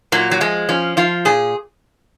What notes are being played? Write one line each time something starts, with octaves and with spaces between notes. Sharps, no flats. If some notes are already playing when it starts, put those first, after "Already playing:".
A#2 F#3
F#3
F3 G#3
F3 C#4
F3 F4
A#2 G#4